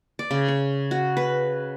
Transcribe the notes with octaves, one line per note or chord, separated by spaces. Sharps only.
D5
C#3
C#5
F#4
B4